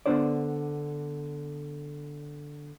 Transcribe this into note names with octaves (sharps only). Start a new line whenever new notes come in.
D3 B3 D4 D#4 C5 D5